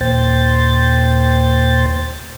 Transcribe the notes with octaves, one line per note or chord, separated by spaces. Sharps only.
D#2 A#2 C5 G5 A6